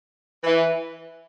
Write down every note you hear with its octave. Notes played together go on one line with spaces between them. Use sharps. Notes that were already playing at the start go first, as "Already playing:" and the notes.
E3